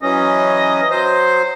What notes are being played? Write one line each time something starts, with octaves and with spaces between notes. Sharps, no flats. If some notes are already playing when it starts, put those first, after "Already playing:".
E3 F#3 C#4 D#5
F#3 C5